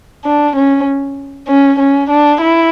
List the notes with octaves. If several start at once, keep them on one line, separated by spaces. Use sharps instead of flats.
D4
C#4
C#4
C#4
D4
E4